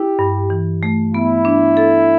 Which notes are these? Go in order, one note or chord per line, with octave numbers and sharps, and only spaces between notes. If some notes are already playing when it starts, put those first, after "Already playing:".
Already playing: E4 G4
G2
E3
A3
B3 E4
D4
A4